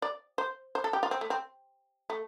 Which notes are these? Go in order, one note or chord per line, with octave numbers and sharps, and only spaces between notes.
D5
C5
C5
A4
G4
F4
C4
A3
C4
A3